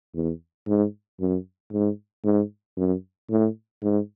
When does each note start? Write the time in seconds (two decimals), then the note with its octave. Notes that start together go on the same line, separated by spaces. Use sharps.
0.15 E2
0.67 G#2
1.20 F#2
1.73 G#2
2.24 G#2
2.77 F#2
3.30 A2
3.82 G#2